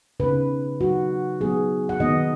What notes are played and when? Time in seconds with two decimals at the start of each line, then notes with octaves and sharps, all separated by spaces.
0.20 C#3 B3 D#4 B4
0.80 F#3 D#4 F#4
1.40 F#3 B3 D#4 G#4
1.89 F#5
2.00 D#3 B3 D#4 D#5